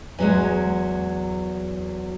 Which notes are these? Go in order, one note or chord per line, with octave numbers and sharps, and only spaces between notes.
E2 F#3 G#3